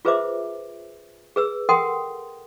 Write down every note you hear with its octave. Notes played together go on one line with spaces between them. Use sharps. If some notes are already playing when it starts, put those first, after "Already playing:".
F4 G#4 B4 C5 E5 D6
G#4 B4 E6
A4 A#4 F#5 G5 C6 D#6